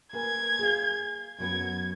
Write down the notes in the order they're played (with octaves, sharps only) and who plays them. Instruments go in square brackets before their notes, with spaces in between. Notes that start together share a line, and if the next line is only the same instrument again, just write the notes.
[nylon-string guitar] A#3 B4 G#5 [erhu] G#6
[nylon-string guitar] G#4 F5
[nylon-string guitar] F#2 F#3 B3 [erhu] G#6